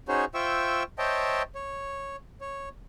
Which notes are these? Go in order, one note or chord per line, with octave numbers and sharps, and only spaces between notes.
C#4 D#4 F#4 G#4 C5 C#5
F4 C5 E5 G5 C#6 E6
C5 C#5 D#5 E5 G5 A5
C#5
C#5